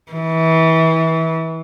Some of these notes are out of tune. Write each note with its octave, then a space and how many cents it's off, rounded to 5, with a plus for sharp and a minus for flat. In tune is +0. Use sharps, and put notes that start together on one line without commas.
E3 -25